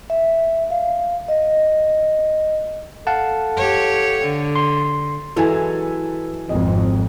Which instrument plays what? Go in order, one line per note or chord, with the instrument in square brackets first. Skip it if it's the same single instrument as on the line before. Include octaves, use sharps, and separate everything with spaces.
[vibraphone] E5
F5
D#5
[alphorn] A4 [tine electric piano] F5 F#5 A5
[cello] G4 C#5
D3
[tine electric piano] C6
[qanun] E3 F#3 G#3 [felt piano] A4 B4 G#5
[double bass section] G#1 F2 [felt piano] D#5